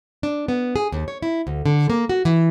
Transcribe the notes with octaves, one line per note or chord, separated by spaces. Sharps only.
D4
B3
G#4
D#2
C#5
E4
D2
D3
A#3
F#4
E3